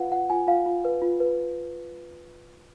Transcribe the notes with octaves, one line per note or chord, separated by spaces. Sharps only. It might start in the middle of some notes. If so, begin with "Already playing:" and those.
Already playing: F4 B4 F5 F#5
F4 F#5
F4 G#5
F4 F5
F4
B4
F4
B4